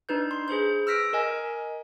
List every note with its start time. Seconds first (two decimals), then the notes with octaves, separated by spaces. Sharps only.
0.09 D4 D#4 B4 G6
0.31 C6
0.48 G#4 B4 C5 G6
0.87 E6 F6 A#6 B6 D7
1.13 A#4 D#5 G#5